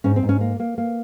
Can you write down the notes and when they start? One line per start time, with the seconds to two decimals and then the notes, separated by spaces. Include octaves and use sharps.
0.04 G#2 C#4
0.16 C4
0.23 G#2
0.29 C#4
0.41 A#3
0.60 A#3
0.78 A#3